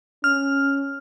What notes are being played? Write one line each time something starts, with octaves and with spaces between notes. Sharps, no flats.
C#4 F6